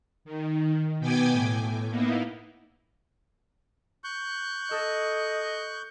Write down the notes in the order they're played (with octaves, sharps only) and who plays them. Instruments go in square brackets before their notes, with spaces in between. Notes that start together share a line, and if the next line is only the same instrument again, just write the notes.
[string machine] D#3
B2 B3 G5 G#5 D6 G#6
A2
A#3 B3 D#4 E4
[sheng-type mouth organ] C#6 F#6 G6
[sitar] A4 [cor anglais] D#5